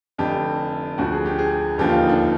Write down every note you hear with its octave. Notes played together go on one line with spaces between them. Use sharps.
F1 F2 D3 G4
D2 D3 F3 F#4
G#4
G4
G#4
F1 D#2 D3 F3 G4
F4
D#4
D4